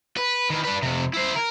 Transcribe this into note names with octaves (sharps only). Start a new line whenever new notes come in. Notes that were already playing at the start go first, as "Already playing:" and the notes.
B4
D#3 E3
D4 B4
F2 C3
E4 C5
A#4